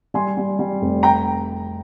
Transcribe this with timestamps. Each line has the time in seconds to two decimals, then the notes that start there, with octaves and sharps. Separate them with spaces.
0.14 G3 G#5 C6
0.37 G3
0.59 G3
0.81 F1
1.03 G5 A#5